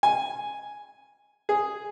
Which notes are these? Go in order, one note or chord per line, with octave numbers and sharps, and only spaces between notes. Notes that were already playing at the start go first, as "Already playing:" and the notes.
G#5
G#4